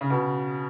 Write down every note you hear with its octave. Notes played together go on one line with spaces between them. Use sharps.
C#3
B2